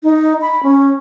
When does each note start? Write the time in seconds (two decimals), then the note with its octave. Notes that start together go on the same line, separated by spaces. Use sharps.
0.03 D#4
0.41 B5
0.63 C#4